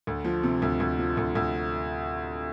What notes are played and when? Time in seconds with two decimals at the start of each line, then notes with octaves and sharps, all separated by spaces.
0.07 D2
0.25 F3
0.43 C3
0.62 D2
0.80 D2
0.99 F3
1.17 D2
1.35 D2